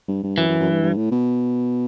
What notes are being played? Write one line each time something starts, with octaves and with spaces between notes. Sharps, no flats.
G2
G2
F#2 E3
F#2
F#2
G2
G2
A2
B2